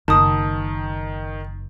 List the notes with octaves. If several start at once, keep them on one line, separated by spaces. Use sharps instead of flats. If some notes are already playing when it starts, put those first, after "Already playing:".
F#1 D#3 A5 D#6